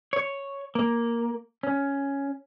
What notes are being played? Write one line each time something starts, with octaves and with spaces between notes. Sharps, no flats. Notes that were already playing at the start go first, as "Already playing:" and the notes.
C#5
A#3
C#4